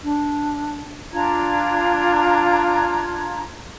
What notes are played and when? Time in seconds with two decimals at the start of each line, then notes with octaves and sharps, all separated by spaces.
0.03 D4
1.12 D4 F4 A#5 G#6